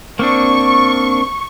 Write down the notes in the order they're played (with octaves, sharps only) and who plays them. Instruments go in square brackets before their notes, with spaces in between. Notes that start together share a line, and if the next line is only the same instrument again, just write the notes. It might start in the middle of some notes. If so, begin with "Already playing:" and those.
[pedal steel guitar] A#3 C4 D4 [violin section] C#6